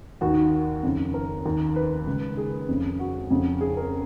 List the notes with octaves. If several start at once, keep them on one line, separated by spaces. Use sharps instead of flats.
D#2 F#4
D#3
F2 C#3
A#4
D#2 D#3
B4
C#2 C#3
G#4
F2 C#3
F#4
F2 C#3
G#4
A#4